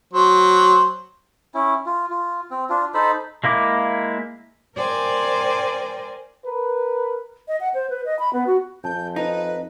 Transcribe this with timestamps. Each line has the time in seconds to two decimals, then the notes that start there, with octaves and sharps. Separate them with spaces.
0.13 F#3 C5
1.54 C#4 E4
1.86 F4
2.10 F4
2.51 C4
2.70 D4 F4
2.94 D#4 A4 C5 B5
3.44 G#3 A#3 E4 D6
4.77 A#4 C5 D5 G5 G#5
6.46 A#4 B4
7.48 D#5
7.60 F#5
7.74 C5
7.90 B4
8.06 D#5
8.19 B5
8.33 B3
8.47 F#4
8.84 F2 G#5 A5 G6
9.16 D#4 B4